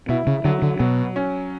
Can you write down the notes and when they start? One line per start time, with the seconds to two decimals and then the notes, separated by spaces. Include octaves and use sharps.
0.09 B2 E4
0.27 C#3
0.45 D3 F#3
0.62 D3
0.79 B2 F#3
1.16 C#4